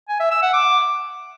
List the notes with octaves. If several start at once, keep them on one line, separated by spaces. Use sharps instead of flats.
G#5
E5
E6
F#5
D6